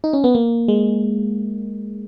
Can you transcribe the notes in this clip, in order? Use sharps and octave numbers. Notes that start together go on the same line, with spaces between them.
D#4
C#4
B3
A#3
G#3